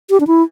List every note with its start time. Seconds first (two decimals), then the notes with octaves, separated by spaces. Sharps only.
0.10 G4
0.20 D4
0.27 E4